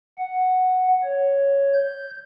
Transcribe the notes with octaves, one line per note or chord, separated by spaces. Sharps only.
F#5
C#5
G6